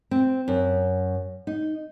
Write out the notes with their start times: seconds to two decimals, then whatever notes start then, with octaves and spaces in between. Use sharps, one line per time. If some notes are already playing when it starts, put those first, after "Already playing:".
0.11 C4
0.48 F#2
1.47 D#4